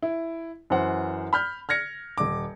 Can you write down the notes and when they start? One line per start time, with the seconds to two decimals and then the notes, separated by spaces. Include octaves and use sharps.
0.02 E4
0.70 F#2 E3 C5 F#5
1.33 B5 F6 G6
1.69 F6 G#6 A#6 C#7
2.18 D#1 D6